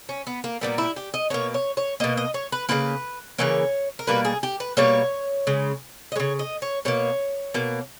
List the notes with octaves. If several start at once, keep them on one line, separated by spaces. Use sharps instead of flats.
C#4
B3
A#3
A#2 G3 A#3 B3
E4
G4
D#5
B2 A#3 C#5
C#5
C#5
B2 A#3 D#5
D#5
C#5
B4
C#3 E3 A#3 B4
C#3 E3 A#3 C#5
A#4
B2 G3 A#3 B4
G#4
G4
B4
B2 G3 A#3 C#5
C#3 G#3
D#5
C#3 G#3 C#5
D#5
C#5
B2 A#3 C#5
B2 A#3